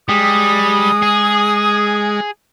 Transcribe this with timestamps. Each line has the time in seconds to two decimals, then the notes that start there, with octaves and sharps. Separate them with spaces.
0.09 G3 G#3 D#6
1.02 G#4